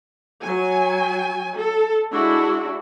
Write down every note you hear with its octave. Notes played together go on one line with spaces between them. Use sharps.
F#3 G#5
A4
G#3 D4 E4 F#4